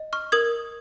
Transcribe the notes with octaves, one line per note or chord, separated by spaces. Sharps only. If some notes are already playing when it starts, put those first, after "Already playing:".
Already playing: D#5
C#6 F6
A#4 D#6 G#6